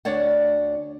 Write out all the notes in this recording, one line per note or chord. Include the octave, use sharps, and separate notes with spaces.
D2 D4 C#5 D5 F#5